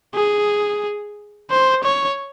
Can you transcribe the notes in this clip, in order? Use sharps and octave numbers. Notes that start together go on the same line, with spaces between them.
G#4
C5
C#5